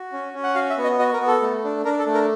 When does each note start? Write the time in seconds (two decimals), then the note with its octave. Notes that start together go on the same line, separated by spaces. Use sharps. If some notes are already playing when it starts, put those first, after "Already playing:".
Already playing: F#4
0.12 C#4
0.34 C#4
0.43 F#5
0.55 F#4 F5
0.70 E5
0.77 B3
0.84 D#5
0.99 F#4 D#5
1.13 A#4
1.20 B3
1.27 A4
1.41 A3
1.64 D4
1.85 D4 A#4
1.99 A4
2.06 A3
2.14 A#4